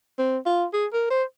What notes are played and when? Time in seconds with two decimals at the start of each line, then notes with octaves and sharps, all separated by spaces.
0.19 C4
0.46 F4
0.74 G#4
0.93 A#4
1.11 C5